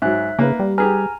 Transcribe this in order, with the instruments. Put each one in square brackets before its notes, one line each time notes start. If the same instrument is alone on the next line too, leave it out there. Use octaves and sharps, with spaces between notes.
[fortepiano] G#2 F#3 [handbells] E5 F#6
[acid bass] C#3 [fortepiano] A#3 B4
[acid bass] G3
[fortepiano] G4 G#4 B4 [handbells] G#5 A#5 F6